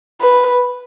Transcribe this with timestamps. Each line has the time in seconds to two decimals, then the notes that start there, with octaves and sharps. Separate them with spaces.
0.21 B4